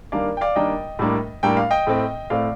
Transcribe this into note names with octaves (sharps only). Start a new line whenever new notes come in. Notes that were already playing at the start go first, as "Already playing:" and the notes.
D#3 G3 A#3 D4 D5 F5
G5
D5 F5
D#3 G3 A#3 D4 D#5 G5
A2 G3 A#3 D4
A2 G3 A#3 D4 G5
F5
D#5 G5
A2 A3 C4
A2 A3 C4 D5 F5